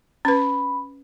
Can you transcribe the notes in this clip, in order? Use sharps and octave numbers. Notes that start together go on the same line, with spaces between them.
C#4 B4 B5